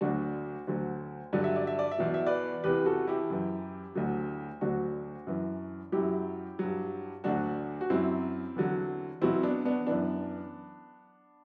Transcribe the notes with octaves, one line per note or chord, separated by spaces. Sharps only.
D2 D3 F#3 D4 F#4
D2 D3 F#3
G2 D3 F#3 D5
E5
D5
E5
D5
E5
E2 B2 F#3 D5
E5
B4 D5
E2 C3 E3 G4 B4
F#4 A4
E4 G4
F#2 E3
D2 D3 F#3
D2 D3 F#3 D4 F#4
F#2 E3
F#2 F#3 E4 G4
G2 F#3
D2 D3 F#3 D4 F#4
F#4
F#2 F#3 C4 E4
E2 D3 F#3
E2 B2 F#3 C4 E4
B3 D4
B3 D4
F#2 E3 B3 D4